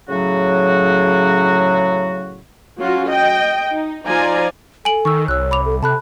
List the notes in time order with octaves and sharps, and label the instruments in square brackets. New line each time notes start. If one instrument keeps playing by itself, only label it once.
[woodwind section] A2 C#3 F#3 F#4
[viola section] F#3 C#4 F4 F#4
D#5 G5
D#4
F3 D#4 F4 D5 G#5 A#5
[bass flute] A4 [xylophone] G#5 D7 F#7
[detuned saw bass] D#3 [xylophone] C#6 E6
[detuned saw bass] C2 [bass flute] C#5 [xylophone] E6 F#6
[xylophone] B5 D6 F7
[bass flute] A4
[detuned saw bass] C3 [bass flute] A4 [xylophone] A5 B5 F#6